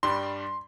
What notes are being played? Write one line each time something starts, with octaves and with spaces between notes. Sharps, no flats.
G2 G3 D4 C6